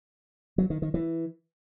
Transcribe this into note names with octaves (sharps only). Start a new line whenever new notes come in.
F#3
D#3
D#3
E3